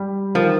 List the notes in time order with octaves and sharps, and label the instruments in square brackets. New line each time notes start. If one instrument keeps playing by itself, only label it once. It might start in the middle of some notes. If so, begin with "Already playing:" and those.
Already playing: [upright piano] G3
[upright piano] D#3 [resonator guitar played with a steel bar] F3